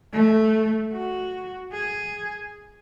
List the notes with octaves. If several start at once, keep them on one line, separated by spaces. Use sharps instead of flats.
A3
F#4
G#4